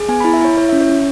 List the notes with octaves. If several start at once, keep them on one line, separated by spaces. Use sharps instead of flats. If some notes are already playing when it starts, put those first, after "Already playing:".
Already playing: G#4
B3 G#5
B5
E4
E5
E4 C#5
E4 C#5
E5
C#4
C#5
C#4